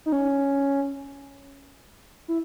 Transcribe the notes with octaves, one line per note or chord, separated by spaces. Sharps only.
D#4
C#4
E4